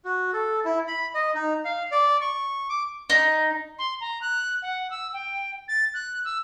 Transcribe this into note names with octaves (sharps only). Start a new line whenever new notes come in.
F#4
A4
E4
B5
D#5
D#4
F5
D5
C#6
D6
D#4
C6
A#5
F#6
F#5
E6
G5
A6
F#6
E6